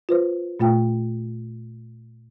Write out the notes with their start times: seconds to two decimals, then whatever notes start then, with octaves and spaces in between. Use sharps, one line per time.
0.09 F4 B4 C5
0.60 A#2 A3 F4 G5